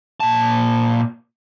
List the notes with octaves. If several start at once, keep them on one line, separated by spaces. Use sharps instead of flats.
A#2 A5